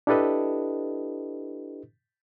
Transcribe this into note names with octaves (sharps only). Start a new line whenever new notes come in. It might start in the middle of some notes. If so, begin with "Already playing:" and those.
D4 E4 G4 A4 B4 D#5